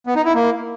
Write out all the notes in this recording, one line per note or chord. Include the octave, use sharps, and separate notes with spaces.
B3
D#4
E4
A#3